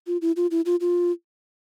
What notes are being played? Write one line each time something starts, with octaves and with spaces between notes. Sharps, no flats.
F4
E4
F4
E4
F4
F4